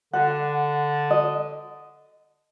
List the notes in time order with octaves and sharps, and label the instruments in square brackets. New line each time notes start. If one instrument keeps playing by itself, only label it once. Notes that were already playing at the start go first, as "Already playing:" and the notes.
[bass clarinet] D3 [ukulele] F#5
[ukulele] D#5